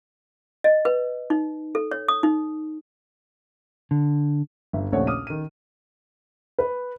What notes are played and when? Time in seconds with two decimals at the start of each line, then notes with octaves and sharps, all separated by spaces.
0.64 D#5
0.85 B4
1.30 D#4
1.75 A4
1.91 C#5
2.08 D#6
2.23 D#4
3.91 D3
4.73 G1 E5
4.92 A#1 D#2 C#3 A3 C#5 F#5
5.07 D6 D#6 F6 D#7
5.27 D#3 D#7
6.59 B4